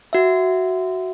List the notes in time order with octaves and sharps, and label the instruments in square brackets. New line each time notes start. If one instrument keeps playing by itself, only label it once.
[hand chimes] F#4 E5